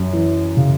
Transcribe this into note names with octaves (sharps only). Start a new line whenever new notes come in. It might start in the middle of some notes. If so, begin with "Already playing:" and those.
Already playing: F#2
E3
C#3